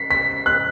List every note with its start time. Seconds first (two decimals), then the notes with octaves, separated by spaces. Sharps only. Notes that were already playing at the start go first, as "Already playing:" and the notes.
Already playing: B6 C7
0.11 B6
0.46 F#6